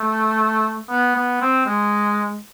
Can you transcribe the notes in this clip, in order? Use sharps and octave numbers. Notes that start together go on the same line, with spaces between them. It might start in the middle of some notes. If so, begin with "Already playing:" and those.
Already playing: A3
B3
B3
C4
G#3